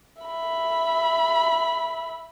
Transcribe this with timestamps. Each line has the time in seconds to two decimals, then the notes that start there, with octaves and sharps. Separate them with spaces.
0.22 E5 B5